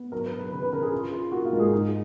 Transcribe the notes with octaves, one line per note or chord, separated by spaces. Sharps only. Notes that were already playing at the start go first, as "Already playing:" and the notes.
Already playing: B3
F#3 A#4
B4
F#3
B4
C#3 B4
B4
C#3 A#4
G#4
F4
F4
A#3 F#4
F4
G#2 A#4
G#4
D#4